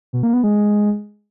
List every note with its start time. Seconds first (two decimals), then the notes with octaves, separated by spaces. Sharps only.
0.13 B2
0.23 A#3
0.33 B3
0.44 G#3